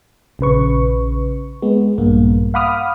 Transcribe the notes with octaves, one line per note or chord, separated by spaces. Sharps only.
A#1 C#3 B4 C#6
G#3 B3
A#1 G2 A#3
F5 F#5 B5 D6 D#6 F6